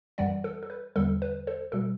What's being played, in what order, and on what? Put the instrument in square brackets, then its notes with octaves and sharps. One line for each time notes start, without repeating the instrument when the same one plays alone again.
[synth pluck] F#2 E3 G3 D5 F#5
A4
A4
B4
E2 D3 G3 A4
B4
A4 C5
B2 G3 A4